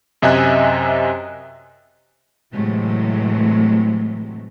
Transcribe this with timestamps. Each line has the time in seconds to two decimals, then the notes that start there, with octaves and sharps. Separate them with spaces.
0.22 F#2 C3 D#5 E5 G#5 F#6
2.54 A2 C3 E3 F#3 G#3 A3